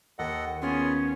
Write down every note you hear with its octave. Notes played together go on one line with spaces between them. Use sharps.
D#2 A4 D#5 F#5
B3 C#4 F4 G#4